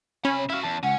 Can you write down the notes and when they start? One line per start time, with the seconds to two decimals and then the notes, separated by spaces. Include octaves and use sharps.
0.25 C3 C#4 B5
0.50 E4 F#4 E5 F5
0.63 E2 A5
0.83 C#2 C#4 F#5